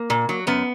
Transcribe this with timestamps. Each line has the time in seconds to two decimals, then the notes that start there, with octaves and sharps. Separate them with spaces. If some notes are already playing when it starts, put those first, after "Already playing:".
Already playing: A#3
0.10 A#2
0.29 F#3
0.47 F#2 B3